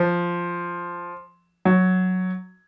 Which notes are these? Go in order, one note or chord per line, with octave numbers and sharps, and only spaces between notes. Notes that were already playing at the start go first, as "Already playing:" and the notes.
Already playing: F3
F#3